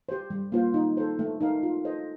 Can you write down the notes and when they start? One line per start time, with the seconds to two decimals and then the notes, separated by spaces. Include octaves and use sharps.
0.09 G4 C5
0.30 G3
0.52 A#3 F4 C5
0.74 D#4
0.97 A4 C5
1.19 A3
1.40 D#4 A#4 F5
1.63 F4
1.85 A4 C5 D#5